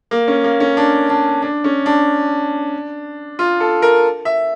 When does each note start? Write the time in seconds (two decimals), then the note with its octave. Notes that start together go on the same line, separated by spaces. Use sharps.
0.11 A#3
0.28 C#4
0.44 A#3
0.60 C#4
0.77 D4
1.10 D4
1.42 D4
1.64 C#4
1.86 D4
3.39 F4
3.60 A4
3.82 A#4
4.25 E5